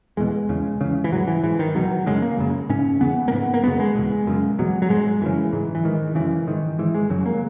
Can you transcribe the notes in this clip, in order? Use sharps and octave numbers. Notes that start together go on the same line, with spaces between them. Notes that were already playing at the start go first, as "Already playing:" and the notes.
E2 B2 G#3
E2 C#3
E2 C#3
E3
G#2 F#3
E3
G#2 E3
D#3
E2 B2 F#3
F#2 C#3 G#3
A#3
F#2 C#3
G#2 C#4
E2 C#3 B3
A#3
G#2 B3
A#3
F#2 C#3 B3
G#3
E2 B2
F#2 C#3
E2 B2 F#3
F#3
G#2 G#3
F#2 C#3 E3
G#2
E3
G#2 D#3
F#2 C#3 E3
G#2 D#3
G#2 E3
G#3
F#2 C#3 F#3
A#3